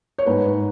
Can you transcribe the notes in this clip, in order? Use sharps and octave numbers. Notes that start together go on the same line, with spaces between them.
C#5
G#2 B4